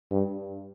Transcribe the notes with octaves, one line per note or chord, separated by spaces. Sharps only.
G2